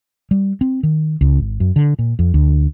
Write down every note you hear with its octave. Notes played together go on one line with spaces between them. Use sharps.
G3
C4
D#3
C#2
G#1
F#2
D3
A#2
F2
D2